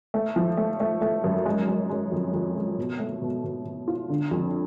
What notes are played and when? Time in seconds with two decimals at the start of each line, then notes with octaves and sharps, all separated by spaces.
0.14 A3
0.36 F3
0.57 A3
0.80 A3
1.01 A3
1.24 F#2
1.45 G#3
1.68 G#3
1.90 G#3
2.12 F2
2.34 F2
2.55 G#3
2.78 B2
2.99 A3
3.22 B2
3.44 B2
3.65 B2
3.88 F4
4.09 D3
4.31 F2